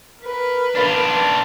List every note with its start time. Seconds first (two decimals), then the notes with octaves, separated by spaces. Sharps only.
0.21 A#4 B4
0.75 D4 F4